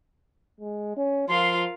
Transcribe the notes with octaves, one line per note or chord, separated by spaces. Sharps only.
G#3
C#4
F3 F4 A#4 F5 C6